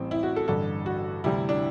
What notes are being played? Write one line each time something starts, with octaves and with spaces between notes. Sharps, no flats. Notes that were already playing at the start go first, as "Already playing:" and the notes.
Already playing: A1 A2 G3 C4
E4
F#4
A4
A1 G2 D3 A4
F#4
D2 C3 E3 G3 E4
D4